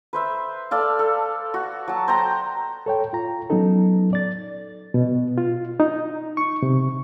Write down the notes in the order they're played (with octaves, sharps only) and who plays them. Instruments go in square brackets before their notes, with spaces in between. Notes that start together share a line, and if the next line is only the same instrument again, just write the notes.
[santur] B4 C5 E5
A4 D5 F5
A4
F#4
F#3 A5
C5 G5 A#5
[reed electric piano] A4 C#5 G5
F4 A#5
F#3 B3 C#4 D#4 A4
D5 A6
B2
F4
D#4
C#6
C3